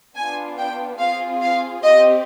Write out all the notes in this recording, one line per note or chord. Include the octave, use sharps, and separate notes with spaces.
B3 D4 F4 G#5
G5
C4 F4 G#4 F5
F5
C4 G4 D#5